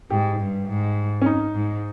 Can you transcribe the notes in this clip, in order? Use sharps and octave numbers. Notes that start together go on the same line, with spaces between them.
G#2 G4
G2
G#2
C#4
D#4
G#2